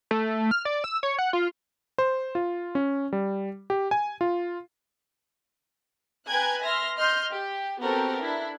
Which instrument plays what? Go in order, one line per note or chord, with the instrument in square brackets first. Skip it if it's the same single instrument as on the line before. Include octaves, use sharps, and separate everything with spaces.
[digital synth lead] A3
F6
D5
E6
C#5
F#5
F4
[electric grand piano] C5
F4
C#4
G3
G4
G#5
F4
[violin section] B4 G5 G#5 A#5 F#6 G#6
E5 C6 F6 A#6
D#5 C6 F6 G6
G4
B3 C4 F#4 G4 A4 A#4
D4 E4